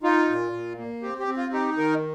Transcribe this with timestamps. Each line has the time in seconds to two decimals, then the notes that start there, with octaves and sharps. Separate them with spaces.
0.03 D#4 F4
0.29 A#2
0.52 A#2
0.78 A#3
1.02 C4 G4
1.19 G4
1.27 C4
1.37 F4
1.53 D#4 G4
1.77 D#3 A#4